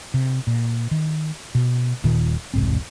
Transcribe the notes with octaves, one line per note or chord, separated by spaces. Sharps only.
C3
A#2
D#3
B2
D#1 A#2 D#3
E1 C2 G#2 C4